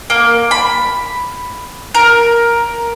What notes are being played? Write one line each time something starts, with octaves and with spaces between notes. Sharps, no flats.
A#3
B5
A#4